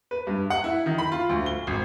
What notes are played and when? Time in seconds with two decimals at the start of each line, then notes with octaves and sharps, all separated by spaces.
0.11 B4
0.27 G2
0.50 F#5
0.64 E4
0.86 D#3
0.98 B5
1.12 F4
1.29 D2
1.46 G7
1.67 G#1